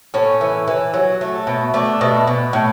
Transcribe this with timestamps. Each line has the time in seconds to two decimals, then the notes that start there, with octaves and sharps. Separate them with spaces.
0.14 A2 C#4
0.41 E3
0.68 E3
0.94 F#3
1.21 A3
1.47 B2
1.74 A3 D4
2.01 B2
2.27 B2
2.53 A2